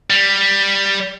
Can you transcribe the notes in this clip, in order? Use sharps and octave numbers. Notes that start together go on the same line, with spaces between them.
G3